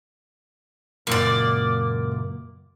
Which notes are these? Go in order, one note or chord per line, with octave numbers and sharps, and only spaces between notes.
C#2 F#2 A#2 A#3 D5